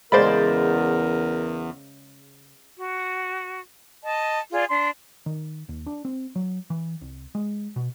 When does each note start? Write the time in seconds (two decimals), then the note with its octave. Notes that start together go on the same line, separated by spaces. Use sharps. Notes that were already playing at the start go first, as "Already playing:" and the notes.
0.12 E2 C#3 G#3 A#4 C5 D5 B5
2.78 F#4
4.03 D#5 A5
4.51 F4 G#4 D5
4.69 D4 C6
5.26 D#3
5.69 D#2
5.86 D4
6.05 C4
6.36 F#3
6.70 E3
7.01 C2
7.35 G#3
7.76 B2